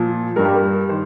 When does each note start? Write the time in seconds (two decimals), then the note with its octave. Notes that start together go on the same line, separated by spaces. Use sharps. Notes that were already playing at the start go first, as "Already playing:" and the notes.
Already playing: A#2 F3
0.36 G2 G3 A#4
0.45 G4
0.55 A#4
0.89 D#3 C5